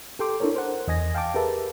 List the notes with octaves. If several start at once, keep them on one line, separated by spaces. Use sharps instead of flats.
G4 A4 G5 C6 D6
D4 E4 A4 A#4 C#5
A#4 C5 F#5
E2 D#5 G#5 A#6
F5 G5 A5 D6
G4 G#4 A#4 B4 E5 A5